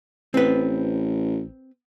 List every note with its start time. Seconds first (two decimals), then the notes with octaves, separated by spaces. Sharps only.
0.34 A1 C4 B4